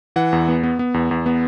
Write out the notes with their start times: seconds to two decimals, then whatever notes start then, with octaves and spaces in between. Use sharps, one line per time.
0.16 E3 F#5
0.33 E2
0.48 B3
0.63 B3
0.79 B3
0.94 E2
1.11 E2
1.26 B3